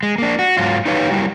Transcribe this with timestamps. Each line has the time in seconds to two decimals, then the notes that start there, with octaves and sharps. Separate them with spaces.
0.03 G#3
0.18 A#3 D4
0.39 F#4
0.57 G#2 F#3 F4
0.86 D#4 G4 B4 C#5 F5
1.11 F#3 G3 E4